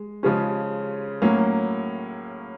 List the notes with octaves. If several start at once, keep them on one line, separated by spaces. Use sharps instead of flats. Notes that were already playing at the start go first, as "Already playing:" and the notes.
Already playing: G#3
C#3 F3 G#3 C#4
A2 F#3 A#3 C#4